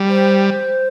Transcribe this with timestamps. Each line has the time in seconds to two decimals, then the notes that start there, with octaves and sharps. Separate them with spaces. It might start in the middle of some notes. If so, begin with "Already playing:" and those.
Already playing: G3
0.09 C5